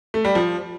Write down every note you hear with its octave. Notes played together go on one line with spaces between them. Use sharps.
A3
G3
F3